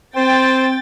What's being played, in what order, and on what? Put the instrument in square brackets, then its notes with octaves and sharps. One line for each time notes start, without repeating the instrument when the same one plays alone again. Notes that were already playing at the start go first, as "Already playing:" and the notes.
[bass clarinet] C4 [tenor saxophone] C5 [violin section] G5 A6